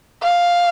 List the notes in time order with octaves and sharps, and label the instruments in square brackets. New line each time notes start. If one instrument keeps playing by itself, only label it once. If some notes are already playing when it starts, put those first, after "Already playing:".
[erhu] F5